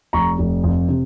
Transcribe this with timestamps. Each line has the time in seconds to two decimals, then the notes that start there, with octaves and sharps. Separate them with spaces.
0.13 F1 A#5 C#6
0.39 F1
0.64 F2
0.88 C3